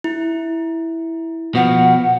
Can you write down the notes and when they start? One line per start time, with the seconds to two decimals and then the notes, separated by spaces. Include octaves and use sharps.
0.04 E4
1.55 B2 F3 F#5